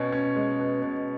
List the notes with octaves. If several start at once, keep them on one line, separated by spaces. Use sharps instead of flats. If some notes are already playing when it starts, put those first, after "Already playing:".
Already playing: B2 C#4
C#4
G#3
B2
B2